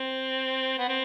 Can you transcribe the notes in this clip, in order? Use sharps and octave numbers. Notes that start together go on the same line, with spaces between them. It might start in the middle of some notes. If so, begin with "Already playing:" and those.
Already playing: C4
B3
C4